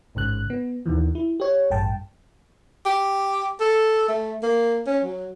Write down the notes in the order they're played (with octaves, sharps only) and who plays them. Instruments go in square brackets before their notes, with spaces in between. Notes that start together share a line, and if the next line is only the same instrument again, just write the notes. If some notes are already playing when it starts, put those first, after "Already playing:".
[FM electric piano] A1 G#2 C#3 F#6
B3
D#2 B2 D#3 E3
E4
G4 C#5
A1 G2 G5 A5
[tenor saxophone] G4
A4
A3
A#3
C#4
F#3